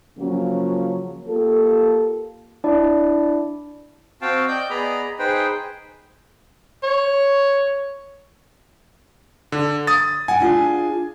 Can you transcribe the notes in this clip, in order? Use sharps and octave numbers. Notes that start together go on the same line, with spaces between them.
C#3 F3 F#3 A#3 C#4
A#3 F4 G4 A4
D4 E4 D5
C4 F#4 F5 G5 A5
D5 D#5 G5 D6 G6
B3 G#4 D5 D#5 A#5 B5
D#4 G#4 B4 C5 G5
C#5
D3
D#6 A6
F#5 G#5
D4 F4 G#4